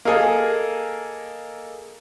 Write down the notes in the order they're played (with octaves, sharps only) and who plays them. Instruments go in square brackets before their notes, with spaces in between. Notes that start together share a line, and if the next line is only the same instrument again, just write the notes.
[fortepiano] A#3 G#4 [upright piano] A4 D#5 F5